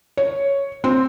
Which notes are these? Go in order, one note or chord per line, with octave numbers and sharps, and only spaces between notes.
C#5
C4